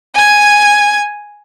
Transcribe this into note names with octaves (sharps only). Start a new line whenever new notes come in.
G#5 G#6